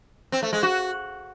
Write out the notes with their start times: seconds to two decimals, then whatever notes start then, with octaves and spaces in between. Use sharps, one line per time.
0.32 C4
0.43 A3
0.53 G#3
0.63 F#4